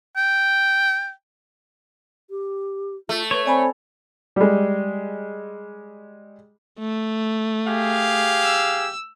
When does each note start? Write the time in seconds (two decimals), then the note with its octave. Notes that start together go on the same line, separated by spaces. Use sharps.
0.16 G5
2.30 G4
3.09 A3 F4
3.31 B4 C#5
3.46 C4 D5 G#5 B5
4.36 G3 G#3
6.79 A3
7.66 G4 G#4 F5
8.44 E6